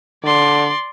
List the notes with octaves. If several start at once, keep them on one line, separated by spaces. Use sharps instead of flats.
D3 D5 C6